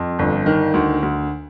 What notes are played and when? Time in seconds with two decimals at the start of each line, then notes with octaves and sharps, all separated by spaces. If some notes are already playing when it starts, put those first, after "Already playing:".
Already playing: F2
0.19 G1
0.46 D#3
0.74 D2
1.03 D2